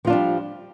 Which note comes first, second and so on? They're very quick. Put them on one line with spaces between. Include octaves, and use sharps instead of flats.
F3 F4 D4 G3